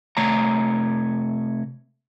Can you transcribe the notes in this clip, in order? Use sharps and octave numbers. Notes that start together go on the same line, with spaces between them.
C3 A3 C#5 A#5